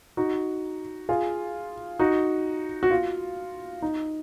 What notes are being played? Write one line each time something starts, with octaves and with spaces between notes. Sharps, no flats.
D#4 F#4
F4 G#4
D#4 F#4
F#4
F4
D#4